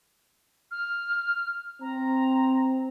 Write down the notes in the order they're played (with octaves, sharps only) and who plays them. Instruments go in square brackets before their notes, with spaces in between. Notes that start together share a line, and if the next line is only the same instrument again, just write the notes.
[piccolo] F6
[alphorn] C4 [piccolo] A#5